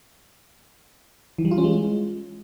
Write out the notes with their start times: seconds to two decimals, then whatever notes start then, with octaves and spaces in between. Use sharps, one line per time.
1.38 E3
1.45 G3
1.51 F4
1.58 C#4
1.64 G#3